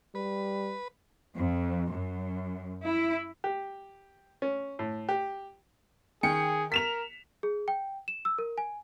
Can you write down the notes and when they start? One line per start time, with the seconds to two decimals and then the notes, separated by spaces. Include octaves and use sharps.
0.15 G3 B4
1.36 F2
1.91 F#2
2.84 E4
3.44 G4
4.42 C#4
4.79 A2
5.09 G4
6.23 D#3 G#4 G5 C#7
6.72 A#4 B6 E7 F7
7.43 G#4
7.68 G5
8.08 E7
8.25 E6
8.38 A#4
8.58 G#5